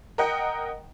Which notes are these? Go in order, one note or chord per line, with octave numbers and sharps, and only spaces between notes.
A#4 D#5 F#5 G5